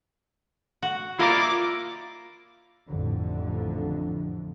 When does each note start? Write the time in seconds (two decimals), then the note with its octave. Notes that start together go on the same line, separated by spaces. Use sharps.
0.82 F#4
1.19 A#3 E4 F4 A#4 C5 D5 D#5 D6
2.88 A1 F2 D3